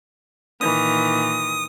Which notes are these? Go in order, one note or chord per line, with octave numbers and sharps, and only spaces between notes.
A#2 D#3 E3 D#6